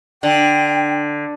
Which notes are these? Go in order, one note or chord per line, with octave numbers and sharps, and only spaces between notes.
D3 G5